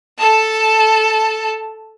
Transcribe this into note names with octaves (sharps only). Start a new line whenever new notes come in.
A4 A5